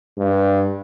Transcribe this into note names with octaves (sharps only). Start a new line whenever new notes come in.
G2